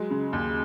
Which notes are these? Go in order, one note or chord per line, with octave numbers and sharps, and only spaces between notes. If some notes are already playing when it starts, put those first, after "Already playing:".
Already playing: F#3 G#3
C#3
D#2